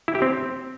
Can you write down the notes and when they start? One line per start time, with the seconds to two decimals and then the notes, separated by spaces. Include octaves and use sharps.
0.08 E4
0.15 G4
0.22 C4